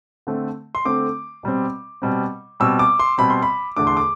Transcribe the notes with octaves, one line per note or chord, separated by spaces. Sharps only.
D3 A3 C4
C6
D3 A3 C4 D6
B2 G3 C4
B2 G3 C4
B2 G3 C4 E6
D6
C6
B2 G3 C4 B5
C6
B5
E2 D3 A3 D4 D6
C6
D6